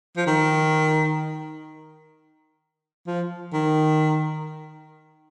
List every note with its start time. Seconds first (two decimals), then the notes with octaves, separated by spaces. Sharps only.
0.17 F3
0.27 D#3
3.07 F3
3.53 D#3